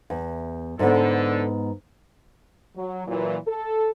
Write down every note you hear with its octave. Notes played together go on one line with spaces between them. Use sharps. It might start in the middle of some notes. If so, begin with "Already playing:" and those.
E2
G#2 D3 B3 A4
F#3
A#2 E3 F#3
A4